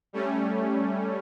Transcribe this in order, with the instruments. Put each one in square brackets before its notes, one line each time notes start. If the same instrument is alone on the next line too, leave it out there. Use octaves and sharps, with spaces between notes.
[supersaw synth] G3 A3 C#4